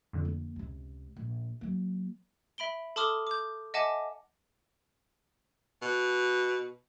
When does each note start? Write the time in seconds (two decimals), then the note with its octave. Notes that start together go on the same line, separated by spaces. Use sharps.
0.13 F2 D3
0.25 A#3
0.56 C#2 C3
1.17 A#1
1.61 F#3 A#3
2.58 E5 B5 D7 G7
2.96 A4 A5 C6 D6 D#6 F6
3.27 D6 G6
3.74 D#5 E5 F#5 G#5 A5 D6
5.82 B2